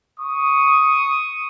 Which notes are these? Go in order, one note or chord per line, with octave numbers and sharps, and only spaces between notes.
C#6 D#6